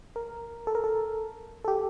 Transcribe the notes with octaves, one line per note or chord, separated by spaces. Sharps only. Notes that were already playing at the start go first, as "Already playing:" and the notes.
A#4
A4
A#4
A4
A4
G4